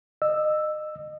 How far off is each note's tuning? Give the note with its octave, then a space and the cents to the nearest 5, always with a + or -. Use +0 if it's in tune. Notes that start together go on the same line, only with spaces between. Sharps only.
D#5 -25 E6 +0